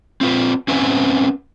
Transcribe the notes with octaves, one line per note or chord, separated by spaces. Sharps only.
C4 F4 B4
C4 C#4 B4 E5 F#5 G#5